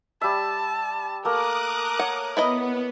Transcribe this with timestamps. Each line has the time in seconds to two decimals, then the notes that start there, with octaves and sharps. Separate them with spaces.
0.21 G3 E5 A5
1.25 A3 A#3 A#4 D6 D#6 F#6
1.99 C#5 F#5
2.37 B3 E4 B4 D#5